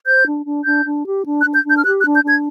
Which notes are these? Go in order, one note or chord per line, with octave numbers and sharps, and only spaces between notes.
C5 G6
D4
D4
D4 G6
D4
G4
D4
F#6
D4
G6
D4 G6
F6
G4 F#6
F#6
D4
G6
D4 G#6